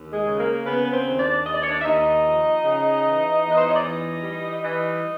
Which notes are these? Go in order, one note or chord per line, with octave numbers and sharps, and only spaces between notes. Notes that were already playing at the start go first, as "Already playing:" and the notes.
Already playing: D#2
G#3 G#4
C#3
A#3 A#4
C#3 B3 B4
B4
C4 C5
D#2
D4 D5
D#2 D#5
D5
C#5
D4 D5
E5
D#2 D#4 D#5
F3
C#3
E3
E2 B4
C5
C#5
D5
E3 D#4 D#5
G3
E3 D#4 D#5